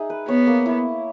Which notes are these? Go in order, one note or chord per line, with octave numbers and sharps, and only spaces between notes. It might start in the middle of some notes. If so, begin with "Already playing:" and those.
Already playing: D#4 G#4 E5
B4
B3 C#5
A#3
E4